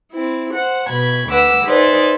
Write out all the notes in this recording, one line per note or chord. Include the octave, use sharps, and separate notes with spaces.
C4 E4
C5 F#5
B2 B5 G#6
D2 B4 F#5 D6 E6
D#4 G#4 B4 C5 D5 E5